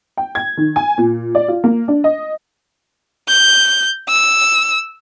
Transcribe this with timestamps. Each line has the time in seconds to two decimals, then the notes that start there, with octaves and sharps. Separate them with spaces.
0.17 G5
0.35 G#6
0.57 D#3
0.76 G#5
0.98 A#2
1.35 D5
1.48 F4
1.64 A#3
1.88 D4
2.04 D#5
3.28 G6
4.09 E6